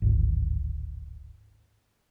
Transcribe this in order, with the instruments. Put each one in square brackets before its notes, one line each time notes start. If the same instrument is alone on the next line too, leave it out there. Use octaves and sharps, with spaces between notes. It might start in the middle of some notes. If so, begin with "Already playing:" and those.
[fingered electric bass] D1 G#1